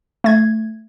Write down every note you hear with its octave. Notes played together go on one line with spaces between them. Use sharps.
A3 G#6